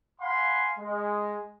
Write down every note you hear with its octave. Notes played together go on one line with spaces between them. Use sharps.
F5 F#5 G#5 B5 C6
G#3